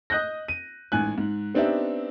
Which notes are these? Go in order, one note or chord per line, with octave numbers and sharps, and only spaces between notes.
D#5 D#6 F#6 G6 A#6
D#7
A1 G#2 G#5 F#6
G#2
B3 C4 D4 D#4 G4 E5